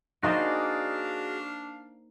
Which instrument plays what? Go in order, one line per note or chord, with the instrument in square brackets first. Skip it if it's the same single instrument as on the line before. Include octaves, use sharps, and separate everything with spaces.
[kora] A#3 D#4 C5 [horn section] D4 F5 [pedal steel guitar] F#4 G#4 D5